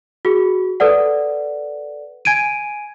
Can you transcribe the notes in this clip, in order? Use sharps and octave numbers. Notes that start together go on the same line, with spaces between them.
F#4 G#4
A4 B4 D5 F#5
G#5 G#6 D7 D#7